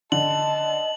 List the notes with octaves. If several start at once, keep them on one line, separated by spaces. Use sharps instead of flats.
D3 D#5 A5 F#7